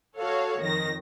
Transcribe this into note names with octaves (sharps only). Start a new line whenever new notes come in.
F#4 A4 C#5 F5
F2 D#3 A#6